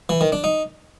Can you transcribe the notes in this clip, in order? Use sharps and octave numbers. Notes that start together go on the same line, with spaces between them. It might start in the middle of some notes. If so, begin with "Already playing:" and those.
E3
D#3
D4
D#4